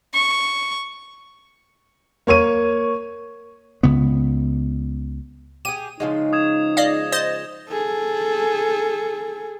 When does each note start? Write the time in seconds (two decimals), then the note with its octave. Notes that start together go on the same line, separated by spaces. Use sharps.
0.14 C#6
2.27 A#3 C#5 C#6 D#7
3.83 C#2 C#3 B3
5.65 G4 G#4 D#7
6.00 C#3 F3 G#3 D#4
6.33 D#6 G#6 E7
6.77 D5 D#5 F5
7.12 C5 D#5 A6
7.69 G#4 A4